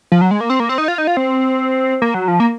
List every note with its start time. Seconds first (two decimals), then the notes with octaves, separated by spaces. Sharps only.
0.12 F3
0.21 F#3
0.31 G#3
0.41 A#3
0.50 C4
0.60 A#3
0.69 C4
0.78 D#4
0.88 F4
0.98 D#4
1.07 F4
1.17 C4
2.02 A#3
2.14 F#3
2.28 F3
2.40 A#3